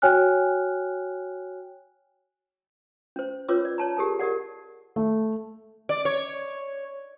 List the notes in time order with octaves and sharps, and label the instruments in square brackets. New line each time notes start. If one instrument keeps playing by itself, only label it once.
[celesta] F#4 C#5 G5 G#5 F6 F#6
[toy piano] C#4 C5
C#4 F4 B4 C#5 D6 E6
D5
C#5 A5 A#5
G4 G#4 A#4 A5
G4 A#4 D5 F#5
[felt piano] A3
[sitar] D5
C#5